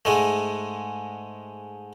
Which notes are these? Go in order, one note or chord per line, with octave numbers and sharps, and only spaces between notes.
G#2 G#3 A3